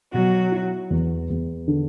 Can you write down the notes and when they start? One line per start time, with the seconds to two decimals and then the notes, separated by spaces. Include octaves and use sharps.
0.13 B2 F#3 F#4
0.52 E4
0.90 E2
1.30 E2
1.68 D3